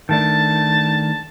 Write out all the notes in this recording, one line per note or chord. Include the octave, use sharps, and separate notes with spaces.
D#3 A3 D4 A5